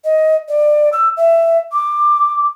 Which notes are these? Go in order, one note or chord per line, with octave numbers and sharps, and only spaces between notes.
D#5
D5
E6
E5
D6